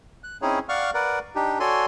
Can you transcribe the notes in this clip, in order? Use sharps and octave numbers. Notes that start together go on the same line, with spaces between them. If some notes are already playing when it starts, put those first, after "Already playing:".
F#6
C4 C#4 D#4 E4 G#4 C#5
D5 F5 F#5 C#6 F6
A#4 B4 D5 F#5
D4 D#4 G4
F#4 A4 C#5 D5 G#5 C6